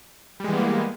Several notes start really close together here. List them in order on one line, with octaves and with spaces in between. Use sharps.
G3 G#3 E3 B3 A#3